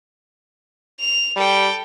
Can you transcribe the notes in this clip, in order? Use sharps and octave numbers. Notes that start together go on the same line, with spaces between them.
F7
G3 A4 G5